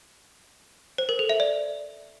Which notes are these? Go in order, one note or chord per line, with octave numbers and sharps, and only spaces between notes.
C5
A#4
A4
E5
D5